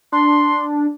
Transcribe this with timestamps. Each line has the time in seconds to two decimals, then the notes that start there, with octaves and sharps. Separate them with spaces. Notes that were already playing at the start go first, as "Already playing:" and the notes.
0.12 D4 C6